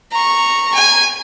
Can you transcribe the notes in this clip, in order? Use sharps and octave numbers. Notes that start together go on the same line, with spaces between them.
A#5 C#6
G#5